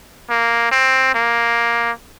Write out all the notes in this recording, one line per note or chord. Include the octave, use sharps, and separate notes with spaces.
A#3
C4
A#3